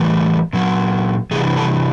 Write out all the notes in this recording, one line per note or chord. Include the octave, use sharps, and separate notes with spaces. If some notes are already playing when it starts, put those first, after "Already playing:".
Already playing: A2 E3 G3
A#2 F#3
C3 E3 G3 G#4
A4